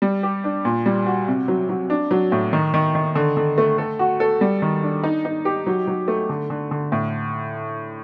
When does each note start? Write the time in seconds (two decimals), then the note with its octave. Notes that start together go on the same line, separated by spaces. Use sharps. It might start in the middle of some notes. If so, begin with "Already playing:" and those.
0.02 G3
0.23 G4
0.44 D4
0.65 A#2
0.86 G3
1.06 F#4
1.28 C3
1.48 F#3
1.69 F#3
1.90 D4
2.11 F#3
2.32 A2
2.53 D#3
2.74 D#3
2.95 D#3
3.15 D3
3.37 D3
3.58 A3
3.78 A4
3.99 F#4
4.20 A4
4.41 G3
4.62 D#3
4.83 D4
5.03 D#4
5.25 D#4
5.45 G4
5.67 F#3
5.87 F#3
6.08 A3
6.29 D3
6.50 D3
6.71 D3
6.92 A2